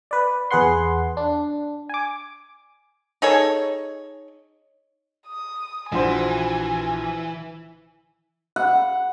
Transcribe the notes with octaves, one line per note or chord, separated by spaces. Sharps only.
B4 D5
E2 G#4 B4 F#5 C6
D4
G#5 D6
D#4 G#4 A4 C#5
D#6
A#1 E3 F#4 C5 G#5
F#5